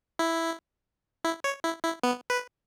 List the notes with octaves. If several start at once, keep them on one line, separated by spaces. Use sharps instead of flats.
E4
E4
C#5
E4
E4
B3
B4